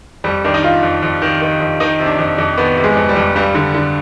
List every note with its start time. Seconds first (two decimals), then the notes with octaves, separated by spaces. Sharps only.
0.24 F2 G3
0.44 D#3 D4
0.54 D#4
0.63 D#3 F4
0.83 F2
1.03 F2
1.22 D#3
1.42 D#3
1.60 F2
1.80 D#3 D#4
2.00 C3
2.06 D4
2.19 F2
2.38 F2
2.58 D#3 B3
2.77 C3
2.84 G#3
2.96 F2
3.09 G3
3.16 F2
3.36 G2 G3
3.55 D3
3.74 D3